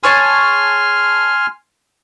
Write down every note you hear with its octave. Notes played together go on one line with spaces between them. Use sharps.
G#4 C#5 G#5 A5 C6 F6